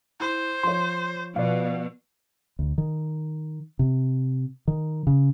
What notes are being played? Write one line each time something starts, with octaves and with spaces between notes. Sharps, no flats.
E4 C5
F3 C#5 C6
B2 F3 D5 F5
D2
D#3
C3
D#3
C#3